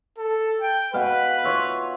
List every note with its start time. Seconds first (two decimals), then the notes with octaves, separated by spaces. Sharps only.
0.18 A4
0.61 G5
0.94 B2 B4 F5 G#5
1.44 F4 C#5 E5